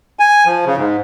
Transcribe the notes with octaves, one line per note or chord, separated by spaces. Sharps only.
G#5
F3
C#3
G#2